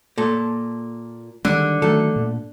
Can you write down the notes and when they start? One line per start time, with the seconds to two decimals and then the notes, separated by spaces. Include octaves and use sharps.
0.18 A#2 A4
1.45 D3 D#3 G3 G#3
1.82 D#3 F#3 A3 A4
2.16 A#2